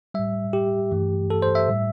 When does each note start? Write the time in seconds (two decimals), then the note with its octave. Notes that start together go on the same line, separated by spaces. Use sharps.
0.14 A2 G3 E5
0.53 G4
0.91 G2 E3 A3
1.30 A4
1.42 C5
1.55 E5
1.68 A2 G3